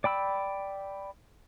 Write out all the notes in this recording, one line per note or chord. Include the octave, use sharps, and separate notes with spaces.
D5 G5 B5 E6